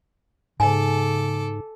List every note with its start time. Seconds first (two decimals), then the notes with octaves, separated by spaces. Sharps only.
0.60 G#2 C#3 A4 G#5 D6